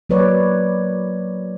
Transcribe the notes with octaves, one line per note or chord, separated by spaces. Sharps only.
F#3 A#3 B4 C#5 D5